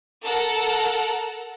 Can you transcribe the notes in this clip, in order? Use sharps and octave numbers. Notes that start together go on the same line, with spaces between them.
A4 A#4 F#5 A#5